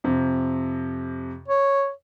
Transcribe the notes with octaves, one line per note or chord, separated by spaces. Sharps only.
F2 C3
C#5